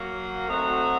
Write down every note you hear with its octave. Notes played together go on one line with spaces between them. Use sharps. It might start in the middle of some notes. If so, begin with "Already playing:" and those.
Already playing: F#3 A#3 F#4
F#3 A3 C4 D#4 F#4